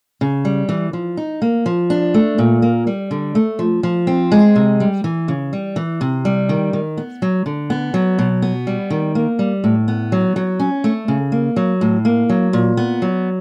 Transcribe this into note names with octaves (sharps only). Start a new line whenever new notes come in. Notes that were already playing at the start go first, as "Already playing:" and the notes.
C#3
G3
E3
F3
D#4
A#3
F3
D4
A3
A#2
A#3
G3
D3
A3
F3
F3
C4
G#3
C3
G3
E3
C#3
G3
E3
C3
G3
D#3
D#3
B3
F#3
D3
B3
F#3
B2
B3
G3
D#3
A#3
G3
A2
B3
F#3
F#3
C#4
A3
C#3
A#3
F#3
A2
A#3
F#3
A#2
B3
F#3